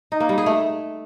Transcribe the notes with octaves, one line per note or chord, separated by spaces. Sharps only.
D#4
A#3
G3
G#4
A3